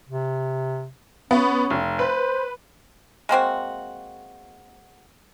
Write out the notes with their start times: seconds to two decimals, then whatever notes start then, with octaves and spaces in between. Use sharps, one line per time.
0.09 C3
1.31 B3 C#4
1.70 F1
1.99 B4 C5
3.29 G#3 A#3 C4 F#4